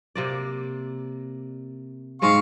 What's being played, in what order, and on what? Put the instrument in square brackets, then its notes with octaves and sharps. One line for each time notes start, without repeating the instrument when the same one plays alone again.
[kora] C3 A#3 D5
[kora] G#2 G#3 C4 [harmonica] F5 C#6